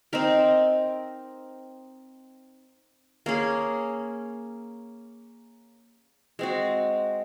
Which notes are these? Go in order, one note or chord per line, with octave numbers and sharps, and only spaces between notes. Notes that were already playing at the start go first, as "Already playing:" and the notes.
C4 D#4 A#4
A#3 C#4 G#4
G#3 C4 F#4